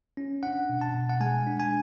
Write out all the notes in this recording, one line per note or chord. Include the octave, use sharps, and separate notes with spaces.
C#4
D4 F#5
B2
A5
B2
F#5
G#3 G#5
D4
G#5